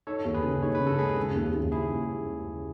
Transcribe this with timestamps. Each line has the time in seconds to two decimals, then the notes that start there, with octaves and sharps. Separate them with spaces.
0.07 D#4 A4 C#5
0.25 D#2
0.34 G#4 B4
0.44 C#3
0.62 D#4 C#5
0.75 B4
0.81 C#3
0.87 A4
0.99 G#3 G#4 B4
1.17 C#3
1.35 D#2
1.53 D#2
1.72 E4 G#4